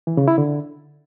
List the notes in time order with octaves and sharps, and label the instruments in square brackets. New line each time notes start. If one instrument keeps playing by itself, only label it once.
[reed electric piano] E3
C#3
E4
D3